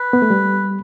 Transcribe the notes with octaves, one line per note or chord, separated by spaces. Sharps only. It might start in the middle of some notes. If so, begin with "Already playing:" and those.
Already playing: B4
B3
A3
G3